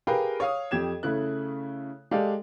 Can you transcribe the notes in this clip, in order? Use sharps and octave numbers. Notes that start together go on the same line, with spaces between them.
G4 G#4 A#4 B4 F5 G5
C#5 F5 D#6
F2 G4 G#6 E7
C#3 A3 E4 F#6
G#3 G4 A4 D5 F5